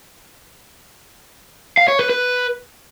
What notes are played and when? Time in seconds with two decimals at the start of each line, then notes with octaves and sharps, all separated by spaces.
1.77 F5
1.88 C#5
1.99 B4
2.10 B4